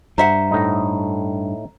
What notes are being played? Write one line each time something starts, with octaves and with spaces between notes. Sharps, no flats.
G2 C5 E5 F#5 A#5
A2 D#4